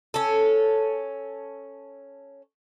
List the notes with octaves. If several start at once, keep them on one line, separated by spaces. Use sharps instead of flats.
C#4 A4